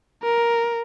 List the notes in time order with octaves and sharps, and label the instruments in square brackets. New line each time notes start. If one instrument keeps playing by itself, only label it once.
[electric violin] A#4